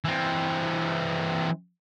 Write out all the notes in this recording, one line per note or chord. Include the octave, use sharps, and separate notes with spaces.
E3 C4